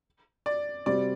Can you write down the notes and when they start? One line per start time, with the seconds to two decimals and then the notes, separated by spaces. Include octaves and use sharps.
0.46 D5
0.86 C3 G3 C4 F#4 D5